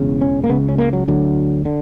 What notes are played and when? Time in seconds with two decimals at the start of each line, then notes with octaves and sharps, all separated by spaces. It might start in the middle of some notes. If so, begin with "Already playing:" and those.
Already playing: E1 E2 C#3
0.21 C#4
0.44 A#3
0.49 C#2 C#3 B3
0.68 C#4
0.78 A#3
0.93 F#3
1.08 D2 D3 F#3
1.65 D3